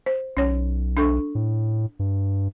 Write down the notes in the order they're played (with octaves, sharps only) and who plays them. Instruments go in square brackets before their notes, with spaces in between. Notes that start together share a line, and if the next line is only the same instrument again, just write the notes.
[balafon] C5
[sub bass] B1 [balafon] C#4 C#5
[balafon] D4 A4 C#6
[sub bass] A2
G2